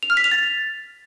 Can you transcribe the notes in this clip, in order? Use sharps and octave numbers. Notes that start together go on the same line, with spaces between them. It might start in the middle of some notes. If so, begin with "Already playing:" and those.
F7
F6
B6
F7
A6